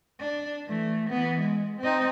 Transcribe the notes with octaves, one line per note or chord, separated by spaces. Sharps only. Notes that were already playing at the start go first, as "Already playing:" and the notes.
D4
E3 A3
E3 B3
G#3
C4 D#4